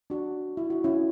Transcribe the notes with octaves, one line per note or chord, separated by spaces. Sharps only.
D4 F#4
E4
F#4
C#4 E4